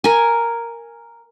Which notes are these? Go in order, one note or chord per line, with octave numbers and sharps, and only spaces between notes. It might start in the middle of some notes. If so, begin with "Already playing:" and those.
A#4 G#5